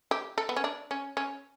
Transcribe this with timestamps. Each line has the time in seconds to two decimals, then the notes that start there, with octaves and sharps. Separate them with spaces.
0.11 G4
0.38 A4
0.49 B3
0.56 C#4
0.64 D4
0.91 C#4
1.17 C#4